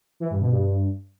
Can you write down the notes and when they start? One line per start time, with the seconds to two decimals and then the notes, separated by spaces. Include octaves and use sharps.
0.20 E3
0.30 G2
0.41 B2
0.51 G2